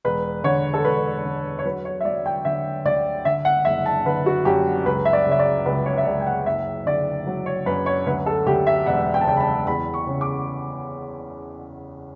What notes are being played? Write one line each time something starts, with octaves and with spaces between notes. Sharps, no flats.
E1 B4
D3 C#5
A4
E1 B4
D3
C#5
F#3 B4
C#5
E5
F#3 D5
G5
D3 E5
D2 D5
D3 E5
F#5
F#1 E5
A5
D3 B4
F#4
F#2 G4
C#2 B4
E5
D5
C#3
E5
D5
C#2 B4
C#5
E5
C#2 D5
G5
F#5
F#1 E5
D3 D5
F#3
C#5
F#2 B4
C#5
D2 B4
A4
D2 G4
E5
E1 F#5
G5
A5
C#3 G5
B5
A5
E2 B5
C#6
C#3
D6